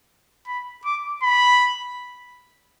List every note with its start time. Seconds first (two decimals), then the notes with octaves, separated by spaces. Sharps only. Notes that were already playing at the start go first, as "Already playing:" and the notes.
0.48 B5
0.85 D6
1.23 B5